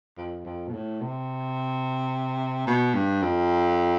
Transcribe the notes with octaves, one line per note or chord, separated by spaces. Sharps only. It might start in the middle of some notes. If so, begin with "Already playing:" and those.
F2
F2
B2
A2
C3
B2
G2
F2